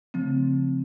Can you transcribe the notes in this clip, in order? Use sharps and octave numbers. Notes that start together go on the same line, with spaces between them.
C#3 F3 A3 C4